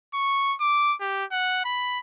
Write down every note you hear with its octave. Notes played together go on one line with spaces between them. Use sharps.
C#6
D6
G4
F#5
B5